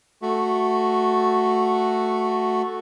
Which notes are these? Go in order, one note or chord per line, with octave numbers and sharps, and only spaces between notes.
A3 F#4